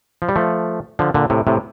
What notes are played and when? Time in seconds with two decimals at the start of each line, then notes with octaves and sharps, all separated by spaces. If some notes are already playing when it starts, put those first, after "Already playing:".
0.22 F3
0.29 G3
0.36 F3 A3
0.99 D3 F3
1.14 A#2 D3
1.30 A2 C3
1.47 A2 C3